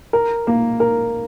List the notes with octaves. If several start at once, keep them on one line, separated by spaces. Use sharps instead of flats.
A#4
A#3
A#4